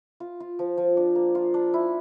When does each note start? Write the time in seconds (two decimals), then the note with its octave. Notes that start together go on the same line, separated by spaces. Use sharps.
0.20 F4
0.40 F4
0.59 F3
0.77 F3
0.97 D4
1.15 A#3
1.35 F4
1.54 D4
1.74 E4